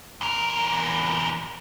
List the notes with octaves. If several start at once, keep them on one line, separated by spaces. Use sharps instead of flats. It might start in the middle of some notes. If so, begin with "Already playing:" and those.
E2 A#4